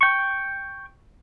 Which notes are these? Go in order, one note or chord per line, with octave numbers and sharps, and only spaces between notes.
G5 C#6